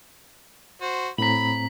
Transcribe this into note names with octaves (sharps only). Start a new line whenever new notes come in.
F#4 C5
A2 C4 A#5 B5 B6 F#7